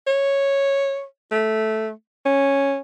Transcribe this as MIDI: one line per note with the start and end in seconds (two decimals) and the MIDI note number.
0.07 1.04 73
1.32 1.91 57
2.26 2.80 61